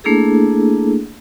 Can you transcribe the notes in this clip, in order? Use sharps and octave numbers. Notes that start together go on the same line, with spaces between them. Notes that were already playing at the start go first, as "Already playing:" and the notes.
A3 A#3 D4 E4 G#4 A4